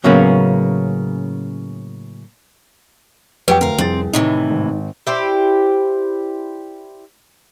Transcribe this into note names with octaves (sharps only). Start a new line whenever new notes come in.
A2 C#3 F#3 A#3 B3 C#4
F2 F#3 G4 B4 G5
D2 A#4 F5
C2 F2 C4 G#4 A6
A2 C3 D#3 E3 D#4
G#1
E4 G4 C5 D5